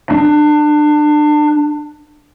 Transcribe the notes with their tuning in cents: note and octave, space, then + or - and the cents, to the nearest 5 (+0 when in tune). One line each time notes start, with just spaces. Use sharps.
D4 +30